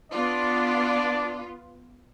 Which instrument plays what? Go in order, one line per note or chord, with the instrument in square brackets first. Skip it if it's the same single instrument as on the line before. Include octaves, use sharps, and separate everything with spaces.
[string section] B3 F4 [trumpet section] D4 D5